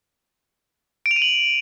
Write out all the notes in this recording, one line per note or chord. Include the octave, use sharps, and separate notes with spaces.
D7
F7
D#7
F#7